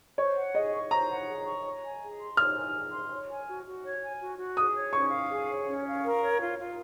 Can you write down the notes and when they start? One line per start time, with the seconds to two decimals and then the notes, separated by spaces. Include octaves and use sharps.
0.18 C5 C#5
0.36 F#5
0.54 G#4 D#5
0.73 C#6
0.91 C5 A#5
1.09 F#5
1.27 G#4
1.46 C#6
1.64 C#5
1.82 G#5
2.01 G#4
2.19 C6
2.37 C#5 F6
2.55 G#5
2.74 G#4
2.92 C6
3.10 C#5
3.29 G#5
3.47 F#4
3.65 F#4
3.83 C#5
4.02 G#5
4.20 F#4
4.38 F#4
4.57 G#4 D#6
4.75 C#5
4.93 C#4 C#6
5.11 F5
5.30 G#4
5.47 C#5
5.66 C#4
5.85 F5
6.03 A#4
6.21 C#5
6.39 F4
6.58 F4